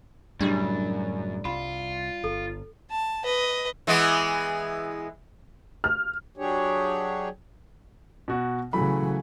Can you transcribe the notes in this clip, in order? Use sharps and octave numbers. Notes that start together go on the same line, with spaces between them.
F#2 A2 C#3 G3 D4 G4 D#5
C2 F4 B5
G1 A4
A5
B4 D#5
E3 G#3 B3
F6
F#3 D4 G4 G#4 C#5
B2 F#4
C#3 E3 F#3 A3 B5